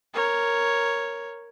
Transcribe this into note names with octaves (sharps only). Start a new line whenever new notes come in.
A#4 C#5